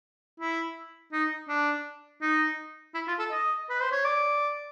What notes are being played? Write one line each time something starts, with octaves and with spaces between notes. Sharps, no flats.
E4
D#4
D4
D#4
E4
F4
A4
D#5
B4
C5
C#5
D5